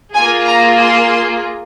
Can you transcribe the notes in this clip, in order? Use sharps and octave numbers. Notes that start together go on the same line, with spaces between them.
A#3 F4 G#4 G#5
A#5
C6